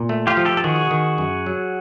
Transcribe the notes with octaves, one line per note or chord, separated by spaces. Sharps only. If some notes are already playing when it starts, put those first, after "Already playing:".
Already playing: A#2
A3
F4 G4
F3
G4 A4
A4
D#3 F#4 G#4
D#3
F#2
F#3